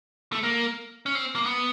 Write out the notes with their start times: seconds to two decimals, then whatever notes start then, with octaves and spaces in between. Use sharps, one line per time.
0.33 A3
0.43 A#3
1.06 C#4
1.15 C4
1.35 A#3
1.46 B3